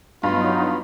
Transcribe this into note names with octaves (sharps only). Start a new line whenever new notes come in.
G2 F#3 B3 D#4 F4